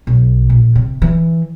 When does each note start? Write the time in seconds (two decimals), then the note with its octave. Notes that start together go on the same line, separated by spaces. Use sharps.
0.07 B1
0.50 A#1
0.75 C3
1.02 E3